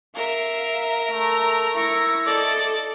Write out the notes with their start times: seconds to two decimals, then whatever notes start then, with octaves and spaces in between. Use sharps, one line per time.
0.15 A#4 E5 F5
1.11 A3 A#5
1.77 E4 C#6 A#6
2.26 A4 D5 D#5 A6